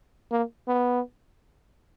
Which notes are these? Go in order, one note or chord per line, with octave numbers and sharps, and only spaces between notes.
A#3
B3